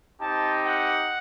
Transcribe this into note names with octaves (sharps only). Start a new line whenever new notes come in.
C4 D#4 G4 A5
F#5